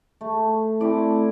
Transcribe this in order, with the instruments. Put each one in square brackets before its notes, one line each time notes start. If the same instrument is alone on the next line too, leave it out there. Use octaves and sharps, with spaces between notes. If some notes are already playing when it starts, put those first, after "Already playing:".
[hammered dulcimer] A3
[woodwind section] A3 C4 E4 [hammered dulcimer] A4 D5